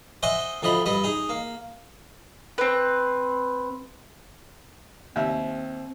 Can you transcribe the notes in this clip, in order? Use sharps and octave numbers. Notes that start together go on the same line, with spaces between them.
C5 D#5 E5 F#5 G#5 C#6
D2 F3 D#5 B5
G2 D#5 B5
D#4 G#4
A#3
C4 B4
D#2 C4 E5